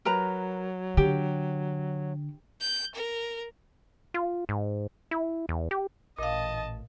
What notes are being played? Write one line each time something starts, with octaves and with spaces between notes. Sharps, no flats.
F#3 A#4 B4 A#5
D3 G4
G6
A#4
F4
G#2
E4
E2
G4
A1 A#2 D#5 F5 A5